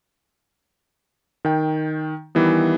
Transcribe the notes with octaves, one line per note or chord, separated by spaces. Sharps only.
D#3 G5
D#3 E3 G3 B3